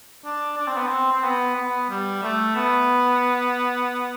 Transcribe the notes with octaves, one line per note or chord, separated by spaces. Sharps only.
D4
D4
C4
B3
C4
C4
B3
B3
G3
A3
B3